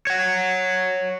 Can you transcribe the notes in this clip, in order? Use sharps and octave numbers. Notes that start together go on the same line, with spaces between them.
C#5 F#5